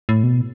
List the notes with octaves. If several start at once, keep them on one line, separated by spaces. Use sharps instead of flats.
A2
B2